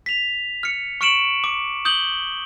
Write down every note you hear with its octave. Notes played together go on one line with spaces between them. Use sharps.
B6 F7
F6 C#7
C#6 F6 C#7 D7 E7 F#7
D6
D#6 G6 F#7 G7